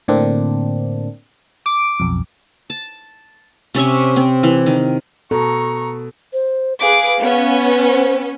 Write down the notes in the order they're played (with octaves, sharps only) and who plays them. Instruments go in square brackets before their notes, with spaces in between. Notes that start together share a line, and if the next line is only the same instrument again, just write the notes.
[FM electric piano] A2 D3 A#3 C4 D4
[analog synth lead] D6
[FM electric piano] B1 F2
[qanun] A5
C3 C#4 E5 C#6
C4
E3
D#3
[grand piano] B2 [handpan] A4 [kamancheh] A#5 C#6
[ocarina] C5
[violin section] G#4 B4 D6 [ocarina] F5
[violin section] B3 C#4
[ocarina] C5